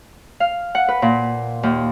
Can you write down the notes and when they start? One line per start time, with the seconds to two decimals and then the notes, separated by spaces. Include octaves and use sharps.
0.40 F5
0.75 F#5
0.88 B4
1.02 A#2
1.63 D#2